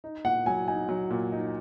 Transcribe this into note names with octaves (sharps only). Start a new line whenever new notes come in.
D#4
A#2 F#5
F#3 G#5
D#4 G#5
F#3
A#2
D#4